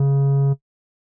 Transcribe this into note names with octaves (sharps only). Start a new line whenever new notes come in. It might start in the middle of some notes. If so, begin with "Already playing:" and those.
Already playing: C#3